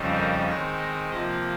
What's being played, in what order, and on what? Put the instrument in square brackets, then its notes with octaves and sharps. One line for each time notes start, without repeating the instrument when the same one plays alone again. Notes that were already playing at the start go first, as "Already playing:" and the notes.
Already playing: [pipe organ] F2 C#3 G3 C4 D#4
A#4
D#3 G#3 C4 D#4 C#5
D#5
C3 F3 A#3 F4 D#5